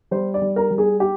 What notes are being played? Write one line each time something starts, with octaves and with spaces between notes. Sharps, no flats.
G3 C5
D5
G3
A#4
G3
G#4
G4